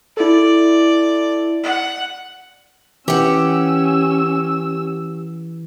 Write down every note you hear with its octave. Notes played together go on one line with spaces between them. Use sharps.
E4 A4 D5
F#5
E3 C#4 G4 F#5 E6